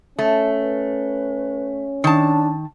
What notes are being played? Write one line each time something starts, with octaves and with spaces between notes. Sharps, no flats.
A3 C#4 A5
B4
D#3 D4 A5